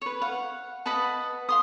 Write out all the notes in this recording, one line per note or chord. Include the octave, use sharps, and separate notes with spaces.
B4 C#5
F5 F#5
B4 D#5 F#5 A5
F5 C6 D#6